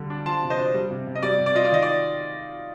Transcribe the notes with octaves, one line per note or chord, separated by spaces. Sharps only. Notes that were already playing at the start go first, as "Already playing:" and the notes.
Already playing: D3 G3
D4
F3 A5 C6
C3
C5 D#5
D4
G3
C3
C3
D#5
G3 D5
C3
D5
F4 D#5
D5
D#3 D#5
D5